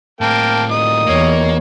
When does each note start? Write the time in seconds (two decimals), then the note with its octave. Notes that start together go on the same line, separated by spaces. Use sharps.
0.21 A2 A#3 C4 G5 A5
0.70 A#2 G3 D#4 D#6
1.06 E2 A#3 C#5